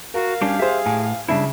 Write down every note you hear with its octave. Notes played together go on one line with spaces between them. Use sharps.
F#4 A#4 F5
G3 C#4 D4 G4
G4 G#4 C5 E5
A2 G#5
C#3 G3 D4 E4 E5